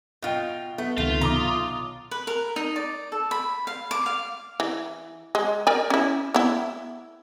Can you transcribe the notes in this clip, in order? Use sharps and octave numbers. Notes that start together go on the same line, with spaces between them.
B2 F4 D#5 G5
A3 B3
C#2 C3 D#3 A3 B3 F4
B1 A#5 D6 D#6 A6
B4
A#4
D#4
D5
A4
B5
F5
D6
F5
E3
G#3
A#4 D5 G#5
C#4 E4
B3 E4